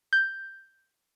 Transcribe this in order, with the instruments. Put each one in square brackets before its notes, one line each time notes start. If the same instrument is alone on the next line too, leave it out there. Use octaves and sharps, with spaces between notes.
[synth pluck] G6